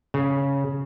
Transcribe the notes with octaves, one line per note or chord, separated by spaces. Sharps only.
C#3